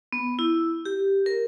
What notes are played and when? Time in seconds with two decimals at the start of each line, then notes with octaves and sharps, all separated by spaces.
0.13 B3
0.39 E4
0.85 G4
1.26 A#4